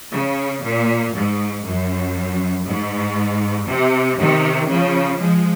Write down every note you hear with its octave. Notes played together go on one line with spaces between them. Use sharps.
C#3
A#2
G#2
F#2
G#2
C3
C3 D#3
C#3 F3
F3 G#3